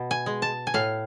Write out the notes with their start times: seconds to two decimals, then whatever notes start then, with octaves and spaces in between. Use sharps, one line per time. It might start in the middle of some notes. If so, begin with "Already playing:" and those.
Already playing: B2
0.11 G#5
0.26 G#3
0.42 A5
0.67 G#5
0.74 A2 F5